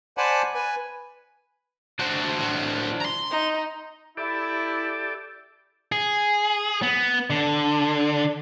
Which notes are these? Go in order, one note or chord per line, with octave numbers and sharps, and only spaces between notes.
C5 D5 F#5 G#5 A5 B5
B4 G#5
D3 D4 F#4 C5
A2 F#4
A#5 C6
D#4
E4 G4 A4 D5
G#4
B3
D3